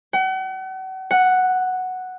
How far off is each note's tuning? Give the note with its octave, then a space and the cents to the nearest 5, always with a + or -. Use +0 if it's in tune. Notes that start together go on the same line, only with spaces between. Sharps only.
F#5 +40
F#5 +0